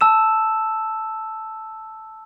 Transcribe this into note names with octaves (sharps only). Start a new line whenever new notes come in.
A5 E6 E7